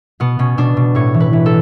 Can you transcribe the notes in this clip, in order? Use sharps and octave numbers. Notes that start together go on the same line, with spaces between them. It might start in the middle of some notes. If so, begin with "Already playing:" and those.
B2 B3
B2 C#4
B2 D4
B2
A2 C#5
E3
B4
E3
A4